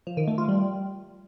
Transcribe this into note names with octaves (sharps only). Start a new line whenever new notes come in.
F3
D#3
A3
F4
G3